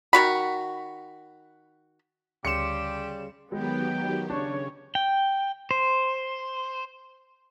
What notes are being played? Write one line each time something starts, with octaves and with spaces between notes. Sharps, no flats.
D#3 F#4 B5
D2 C#3 G3 G4 C6 C#7 E7
D#3 F#3 G#3 B3 G4 G5
C#3 D4 C#5
G5
C5